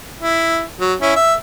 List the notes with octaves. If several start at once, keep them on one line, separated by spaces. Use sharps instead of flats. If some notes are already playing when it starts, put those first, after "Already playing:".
E4
F#3
C#4 E4
E5